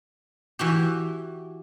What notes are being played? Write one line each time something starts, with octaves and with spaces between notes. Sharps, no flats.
E3 F#4 G4